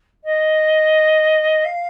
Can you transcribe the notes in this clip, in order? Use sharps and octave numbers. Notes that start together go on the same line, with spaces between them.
D#5
F5